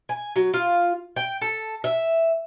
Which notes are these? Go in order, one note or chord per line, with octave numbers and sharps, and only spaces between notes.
G#5
F#3
F4
G5
A4
E5